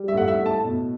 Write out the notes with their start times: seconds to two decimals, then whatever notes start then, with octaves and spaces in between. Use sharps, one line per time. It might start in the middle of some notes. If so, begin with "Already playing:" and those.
Already playing: G3
0.08 E5
0.14 A2 F#5
0.28 E5
0.39 A2
0.46 A5
0.64 B2